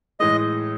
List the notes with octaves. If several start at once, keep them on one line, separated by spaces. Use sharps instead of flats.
A2 E3 G#3 D#5